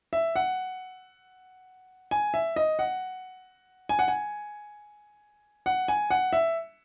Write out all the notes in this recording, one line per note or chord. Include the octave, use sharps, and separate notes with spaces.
E5
F#5
G#5
E5
D#5
F#5
G#5
F#5
G#5
F#5
G#5
F#5
E5